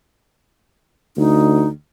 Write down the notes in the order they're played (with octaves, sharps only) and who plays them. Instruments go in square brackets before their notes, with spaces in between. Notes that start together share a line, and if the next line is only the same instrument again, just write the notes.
[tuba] D2 [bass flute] D#4